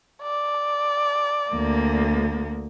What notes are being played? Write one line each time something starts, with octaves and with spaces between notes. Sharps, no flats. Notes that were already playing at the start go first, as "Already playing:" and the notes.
D5
D2 A#3